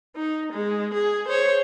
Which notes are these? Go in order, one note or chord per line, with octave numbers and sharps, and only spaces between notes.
D#4
G#3
G#4
C5 C#5